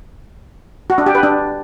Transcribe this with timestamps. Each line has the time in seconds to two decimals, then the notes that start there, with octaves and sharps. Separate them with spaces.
0.90 F#4
0.98 D4
1.06 G4
1.15 B4
1.23 D4